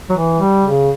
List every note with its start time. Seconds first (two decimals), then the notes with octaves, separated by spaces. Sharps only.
0.09 F#3
0.13 E3
0.39 G3
0.64 C#3